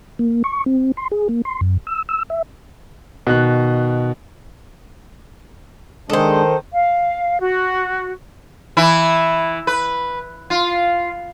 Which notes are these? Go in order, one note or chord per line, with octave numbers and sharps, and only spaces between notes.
A#3
C#6
C4
C6
G#4
A#3
C6
F#2
E6
E6
E5
B2 D#3 F#6
D#3 G#3 D4 G#4 A4 C5
F5
F#4
E3 E4
B4
F4